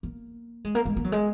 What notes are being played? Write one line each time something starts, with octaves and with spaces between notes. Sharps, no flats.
A#3
G#3
A#3
G#3
A#3
F#3
G#3